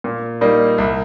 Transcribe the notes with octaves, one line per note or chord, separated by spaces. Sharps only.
A#2
G3 A#3 D#4
C2